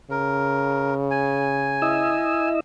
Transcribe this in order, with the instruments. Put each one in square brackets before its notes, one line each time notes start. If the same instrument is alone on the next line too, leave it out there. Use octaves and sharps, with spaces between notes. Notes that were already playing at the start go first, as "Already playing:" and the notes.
[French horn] C#3 [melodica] A#4
[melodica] G#5
[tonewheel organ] E4 D#5 E6